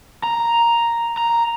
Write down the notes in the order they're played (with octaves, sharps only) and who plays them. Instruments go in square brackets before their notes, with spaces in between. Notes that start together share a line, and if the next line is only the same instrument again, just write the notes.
[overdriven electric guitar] A#5
A#5